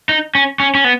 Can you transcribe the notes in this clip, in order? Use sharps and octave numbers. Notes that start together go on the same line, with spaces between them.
D#4
C#4
C#4
C#4
B3